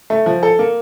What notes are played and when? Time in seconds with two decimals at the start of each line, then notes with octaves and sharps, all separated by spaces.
0.10 A3
0.26 F3
0.43 A4
0.59 A#3